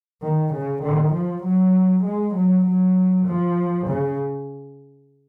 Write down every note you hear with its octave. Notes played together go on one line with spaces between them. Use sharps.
D#3
C#3
D#3
F3
F#3
G#3
F#3
F#3
F3
C#3